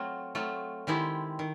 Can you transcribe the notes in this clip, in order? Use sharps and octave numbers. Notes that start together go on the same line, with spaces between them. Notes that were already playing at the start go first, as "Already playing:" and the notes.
Already playing: F#3 A3 C4 F4
F#3 A3 C4 F4
D#3 G#3 C4 E4 G4
D#3